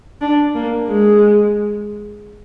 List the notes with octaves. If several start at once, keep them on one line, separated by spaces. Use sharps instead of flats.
D4
A#3
G#3